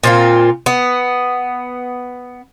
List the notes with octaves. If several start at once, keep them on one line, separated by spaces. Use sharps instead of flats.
A#2 C4 F4
B3